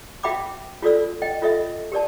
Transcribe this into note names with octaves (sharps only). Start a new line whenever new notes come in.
F#4 E5 G5 B5 D6
F4 F#4 A4 D5 E6
D#5 G5
F4 A4 D#5 E5
G4 A#4 D5 A5